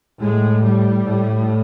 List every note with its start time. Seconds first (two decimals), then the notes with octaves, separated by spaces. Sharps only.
0.19 A2 G#3
0.62 G3
1.04 A2